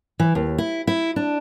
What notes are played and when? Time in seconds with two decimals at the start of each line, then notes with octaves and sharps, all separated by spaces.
0.19 E3
0.35 D#2
0.58 E4
0.87 E4
1.16 D4